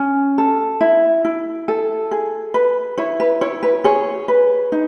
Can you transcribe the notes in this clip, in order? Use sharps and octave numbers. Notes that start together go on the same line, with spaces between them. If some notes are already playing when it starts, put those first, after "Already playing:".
Already playing: C#4
A4
E4
E4
A4
G#4
B4
E4 C#5
B4
E4 C#5
B4
G#4 C#5
B4
D#4